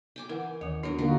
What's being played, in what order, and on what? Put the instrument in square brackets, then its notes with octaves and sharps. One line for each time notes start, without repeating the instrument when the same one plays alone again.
[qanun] G5 G#5 D6
[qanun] E3 [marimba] A#4 F#5
[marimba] D#2 D#3 [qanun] C#5
[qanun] F#3 B3 A#4 [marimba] D4
[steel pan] D3 A#3 F#4 [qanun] D#4 F4 A#4